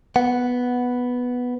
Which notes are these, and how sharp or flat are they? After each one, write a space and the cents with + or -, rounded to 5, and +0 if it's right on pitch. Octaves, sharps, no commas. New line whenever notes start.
B3 +0 F#5 +0